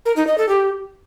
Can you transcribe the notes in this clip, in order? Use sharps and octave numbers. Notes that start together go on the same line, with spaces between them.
A#4
D#4
D#5
A4
G4